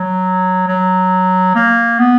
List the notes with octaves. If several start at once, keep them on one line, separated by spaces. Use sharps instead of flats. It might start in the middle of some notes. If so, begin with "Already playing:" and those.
Already playing: F#3
F#3
A#3
B3